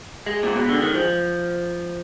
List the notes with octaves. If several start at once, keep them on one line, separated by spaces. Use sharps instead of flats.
G#3
A#2
B2
D3
D#3
F3